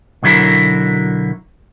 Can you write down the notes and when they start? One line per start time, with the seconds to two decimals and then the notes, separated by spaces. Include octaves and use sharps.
0.23 B1 D3 F#3 E4 A#4